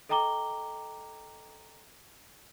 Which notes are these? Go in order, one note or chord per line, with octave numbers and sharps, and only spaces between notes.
A4 D#5 G5 A#5 D6 G7